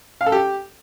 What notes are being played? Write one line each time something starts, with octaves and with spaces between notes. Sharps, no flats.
F5
A4
G4